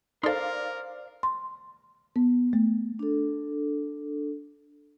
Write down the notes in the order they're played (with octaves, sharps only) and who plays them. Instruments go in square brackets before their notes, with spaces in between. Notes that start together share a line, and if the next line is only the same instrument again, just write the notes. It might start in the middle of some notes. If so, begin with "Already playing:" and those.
[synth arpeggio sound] D#4 A4 [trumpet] A#4 [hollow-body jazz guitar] C5 C6 [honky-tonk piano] D5 F5
[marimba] C6
B3
A3
[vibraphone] D4 A4